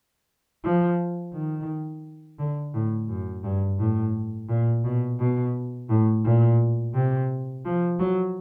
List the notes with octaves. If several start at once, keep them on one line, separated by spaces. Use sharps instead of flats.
F3
D#3
D3
A2
F#2
G2
A2
A#2
B2
B2
A2
A#2
C3
F3
F#3